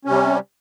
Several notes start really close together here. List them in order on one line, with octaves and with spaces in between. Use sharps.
C#4 C3 G3